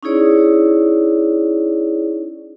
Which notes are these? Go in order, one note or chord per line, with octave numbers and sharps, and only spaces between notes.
C#4 D#4 E4 G#4 C#5 D5